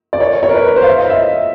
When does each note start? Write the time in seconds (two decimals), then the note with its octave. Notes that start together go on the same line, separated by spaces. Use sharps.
0.13 D5
0.20 C#5
0.43 C#5
0.49 A#4
0.54 B4
0.65 B4
0.76 C5
0.82 F5
0.87 E5
0.99 D#5
1.10 E5